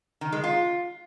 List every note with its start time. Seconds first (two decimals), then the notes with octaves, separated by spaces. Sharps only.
0.21 D#3
0.32 G#3
0.44 F4